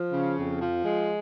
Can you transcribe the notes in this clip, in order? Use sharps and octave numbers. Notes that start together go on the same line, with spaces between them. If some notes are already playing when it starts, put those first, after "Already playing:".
Already playing: F3
C#3
F2
F3
G#3